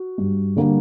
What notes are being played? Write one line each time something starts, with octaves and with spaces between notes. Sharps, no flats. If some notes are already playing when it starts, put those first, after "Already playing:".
Already playing: F#4
G2
D3 G3 A#3